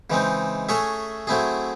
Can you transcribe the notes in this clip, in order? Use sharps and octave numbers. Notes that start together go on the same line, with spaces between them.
C#3 E3 G#3 C4 D#4
A3 C#4 G#4 C#5 E5
F#3 A3 C4 E4 G#4